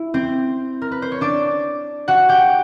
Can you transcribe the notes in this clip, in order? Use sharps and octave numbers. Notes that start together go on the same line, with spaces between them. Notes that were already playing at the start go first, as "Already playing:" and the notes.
Already playing: E4
C4 C5
A#4
B4
C5
C#5
D4 D5
F#4 F#5
G4 G5